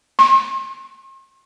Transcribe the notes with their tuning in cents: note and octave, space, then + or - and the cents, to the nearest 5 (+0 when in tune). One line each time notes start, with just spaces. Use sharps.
C6 +45